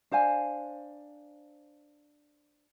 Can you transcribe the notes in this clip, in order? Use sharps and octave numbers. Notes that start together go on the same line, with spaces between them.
D4 C5 F5 G#5